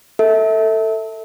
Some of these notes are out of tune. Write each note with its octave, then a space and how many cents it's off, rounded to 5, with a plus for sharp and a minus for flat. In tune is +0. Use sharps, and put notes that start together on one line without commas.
A4 +20 E5 -25